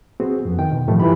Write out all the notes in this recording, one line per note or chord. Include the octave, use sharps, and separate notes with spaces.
B3 C4 F#4 G#4
F2 B3
D#3 G5
B2
A2 C3 D#3 F3 G3 A3
G2 E3 F4 G4 B5